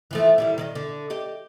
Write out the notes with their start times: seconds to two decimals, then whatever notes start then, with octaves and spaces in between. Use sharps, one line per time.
0.11 E3 F3 A3
0.38 D#3 G3 E4
0.58 D#3 D5 D#5
0.75 D3
1.10 G4 D#5